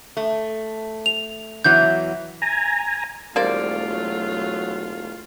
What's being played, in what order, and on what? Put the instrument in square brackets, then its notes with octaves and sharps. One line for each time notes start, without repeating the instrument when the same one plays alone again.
[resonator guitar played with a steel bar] A3
[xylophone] F7
[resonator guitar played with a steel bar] E2 E3 F#3 [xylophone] G6
[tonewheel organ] G#5 A#5
[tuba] E1 [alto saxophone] G3 [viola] A3 F4 [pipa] A#3 C5 D5
[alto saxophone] F#3